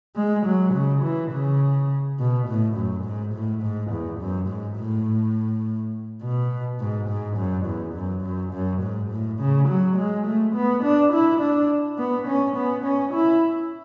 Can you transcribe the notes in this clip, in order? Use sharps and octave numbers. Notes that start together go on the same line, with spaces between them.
G#3
F#3
C#3
E3
C#3
B2
A2
F#2
G#2
A2
G#2
E2
F#2
G#2
A2
B2
G#2
G#2
F#2
E2
F#2
F#2
F#2
G#2
A2
C#3
F#3
G#3
A3
B3
D4
E4
D4
B3
C#4
B3
C#4
E4